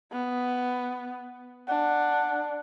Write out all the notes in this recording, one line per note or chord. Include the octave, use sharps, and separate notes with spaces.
B3
D4 F#5